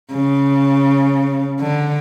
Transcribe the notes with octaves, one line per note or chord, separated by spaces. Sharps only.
C#3
D3